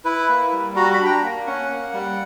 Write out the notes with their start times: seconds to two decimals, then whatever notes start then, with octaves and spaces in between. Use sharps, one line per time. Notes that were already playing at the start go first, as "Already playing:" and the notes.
0.05 E4 B4
0.29 A#3
0.52 G3
0.76 F#4 A#5
0.93 B5
0.99 D4
1.05 G5
1.11 A#5
1.23 A#3
1.46 C#4 F#5
1.70 A#3
1.93 G3